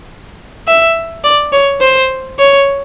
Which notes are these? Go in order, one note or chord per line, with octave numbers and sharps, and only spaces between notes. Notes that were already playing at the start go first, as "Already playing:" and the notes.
E5
D5
C#5
C5
C#5